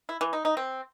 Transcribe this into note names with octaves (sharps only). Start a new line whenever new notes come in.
E4
E3
D#4
D#4
C4